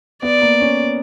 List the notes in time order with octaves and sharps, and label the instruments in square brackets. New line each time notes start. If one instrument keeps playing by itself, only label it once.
[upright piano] B3 [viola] D5
[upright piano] A#3
C#4